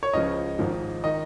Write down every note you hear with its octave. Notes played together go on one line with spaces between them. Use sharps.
C#5
C#2 C#3 F3 D#5
G#1 G#2 F3
D#3 D#5